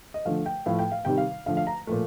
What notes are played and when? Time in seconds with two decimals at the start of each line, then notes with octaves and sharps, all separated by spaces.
0.14 D#5
0.25 D3 F3 A3 F5
0.46 G5
0.66 A2 F3 A3 F5
0.79 G5
0.92 F5
1.05 C3 D#3 G3 G5
1.18 F5
1.46 D3 F3 A3 F5
1.57 F5
1.67 A#5
1.87 A#2 F3 A3